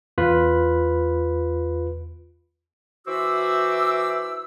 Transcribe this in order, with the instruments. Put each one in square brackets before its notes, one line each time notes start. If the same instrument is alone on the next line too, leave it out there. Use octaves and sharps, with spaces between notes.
[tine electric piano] E2 F4 B4 B5
[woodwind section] E3 F#4 C5 E5 D6 E6